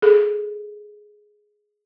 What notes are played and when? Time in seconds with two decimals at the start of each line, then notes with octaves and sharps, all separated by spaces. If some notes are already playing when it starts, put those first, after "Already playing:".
0.02 G#4 A4